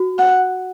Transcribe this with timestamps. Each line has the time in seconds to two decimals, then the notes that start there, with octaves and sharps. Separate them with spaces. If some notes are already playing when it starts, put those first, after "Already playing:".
Already playing: F#4
0.18 F#5